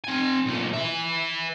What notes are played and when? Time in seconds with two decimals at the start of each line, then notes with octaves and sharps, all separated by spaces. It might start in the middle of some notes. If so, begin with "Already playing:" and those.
0.04 C4 G#5
0.46 B1 A#2
0.73 B4 E5